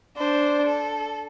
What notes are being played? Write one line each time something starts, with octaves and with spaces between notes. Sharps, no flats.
D4 C5
A4